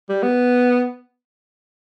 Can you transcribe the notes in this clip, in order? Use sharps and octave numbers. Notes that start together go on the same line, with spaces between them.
G3
B3